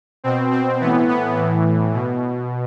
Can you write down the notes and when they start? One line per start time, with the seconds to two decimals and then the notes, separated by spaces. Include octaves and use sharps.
0.24 B2 C4
0.52 C4
0.80 A2 E3 B3
1.09 B3
1.37 A2 E3
1.93 B2